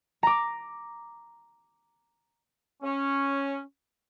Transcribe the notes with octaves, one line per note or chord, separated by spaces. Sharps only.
A#5 D6
C#4